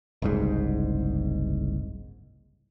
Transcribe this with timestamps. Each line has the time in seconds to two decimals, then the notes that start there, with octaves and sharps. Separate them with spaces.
0.22 F#1 C2 G#2